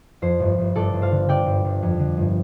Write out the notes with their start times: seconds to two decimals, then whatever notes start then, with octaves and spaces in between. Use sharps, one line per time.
0.22 F2 C5
0.40 G1
0.58 G1
0.75 G1 A4 D5
0.93 G1
1.02 C5 F5
1.11 D3
1.29 D3 D5 G5
1.46 G1
1.64 G1
1.82 F2
1.99 D3
2.17 G1